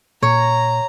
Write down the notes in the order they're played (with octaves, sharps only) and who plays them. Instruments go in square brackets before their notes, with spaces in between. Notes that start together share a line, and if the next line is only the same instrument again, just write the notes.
[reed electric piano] A#2 [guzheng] C#5 [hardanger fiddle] A#5